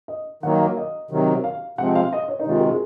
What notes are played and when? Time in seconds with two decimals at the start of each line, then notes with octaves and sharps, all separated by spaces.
0.08 D#5
0.43 D#3 F#3 A#3 F#5
0.60 F5
0.77 D#5
1.11 C3 D#3 F#3
1.44 F5
1.78 C3 F3 G#3 C4 F#5
1.95 F5
2.13 D#5
2.28 C#5
2.39 D#4
2.46 C3 D#3 G#3 F4
2.60 F#4
2.70 G#4